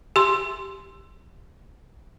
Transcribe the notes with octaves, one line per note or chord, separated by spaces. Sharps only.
G4 C6